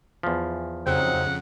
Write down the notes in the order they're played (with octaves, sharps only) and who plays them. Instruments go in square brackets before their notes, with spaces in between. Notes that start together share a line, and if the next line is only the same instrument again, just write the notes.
[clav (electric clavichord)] E2 F3
[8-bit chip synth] F2 C#3 [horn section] F#3 C4 D#4 [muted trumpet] F#5